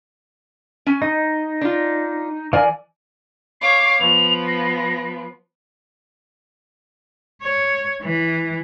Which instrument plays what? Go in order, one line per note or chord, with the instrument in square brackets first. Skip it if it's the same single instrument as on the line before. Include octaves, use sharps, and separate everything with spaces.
[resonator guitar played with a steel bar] C#4 G#5
[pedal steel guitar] D#4 [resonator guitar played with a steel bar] D#5
[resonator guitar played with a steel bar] D4 F4
[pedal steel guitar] E3 D5 G#5 [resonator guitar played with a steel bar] A#4 F5
[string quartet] C#5 F5 D6 [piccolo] C7
[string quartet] F3 B3 [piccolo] F7
[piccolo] A#6
[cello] C#5
E3